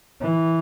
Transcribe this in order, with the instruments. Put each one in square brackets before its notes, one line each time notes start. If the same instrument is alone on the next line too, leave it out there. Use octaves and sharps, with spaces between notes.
[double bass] E3